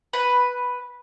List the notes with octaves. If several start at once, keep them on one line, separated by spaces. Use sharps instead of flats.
B4